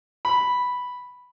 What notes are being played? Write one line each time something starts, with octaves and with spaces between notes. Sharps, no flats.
B5